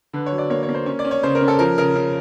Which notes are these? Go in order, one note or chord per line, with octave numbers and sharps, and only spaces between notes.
D3 B4
C#5
F#3
D5
A#3 C#5
C#5
A#3
C5
C#4 C#5
D5
C#4
C#5
C#3 C5
A#4
C#4
A4
F3 A#4
C#3 A#4
C#3